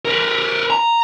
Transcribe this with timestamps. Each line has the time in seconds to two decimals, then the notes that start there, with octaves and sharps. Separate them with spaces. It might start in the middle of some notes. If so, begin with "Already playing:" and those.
0.05 A#4 B4
0.70 A#5